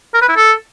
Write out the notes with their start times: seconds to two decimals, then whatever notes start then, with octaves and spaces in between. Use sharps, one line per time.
0.14 A#4
0.21 B4
0.29 E4
0.36 A4